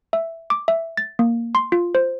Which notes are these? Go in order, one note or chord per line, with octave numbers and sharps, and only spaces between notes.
E5
D6
E5
A6
A#3
C6
F4
C5